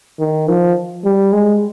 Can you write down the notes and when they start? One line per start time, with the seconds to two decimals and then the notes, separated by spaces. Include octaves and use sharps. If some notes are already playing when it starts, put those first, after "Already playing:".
0.19 D#3
0.48 F3
1.04 G3
1.33 G#3